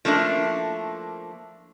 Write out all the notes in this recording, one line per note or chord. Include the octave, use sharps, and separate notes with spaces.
F3 A3 A#3 D4 E4